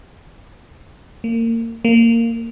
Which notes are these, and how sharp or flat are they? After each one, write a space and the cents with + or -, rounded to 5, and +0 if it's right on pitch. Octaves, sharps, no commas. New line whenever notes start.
A#3 -30
A#3 -15